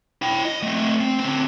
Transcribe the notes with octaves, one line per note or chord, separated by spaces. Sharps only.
E4 G5
D#5
A3 C4
C4
D3 C4